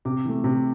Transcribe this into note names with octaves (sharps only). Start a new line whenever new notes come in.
C3 D6
E3 A3
C3